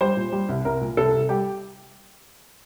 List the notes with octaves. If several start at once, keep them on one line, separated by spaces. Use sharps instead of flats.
G3 C5
A#2
G3
C2
C2 A#4
A#2
C2 A4
C2
G3 G4